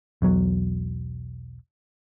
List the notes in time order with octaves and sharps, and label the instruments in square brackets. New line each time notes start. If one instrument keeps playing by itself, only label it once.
[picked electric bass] E1 B1 F#3